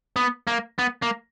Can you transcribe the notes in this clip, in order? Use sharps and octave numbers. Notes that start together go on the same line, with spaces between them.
B3
A#3
B3
A#3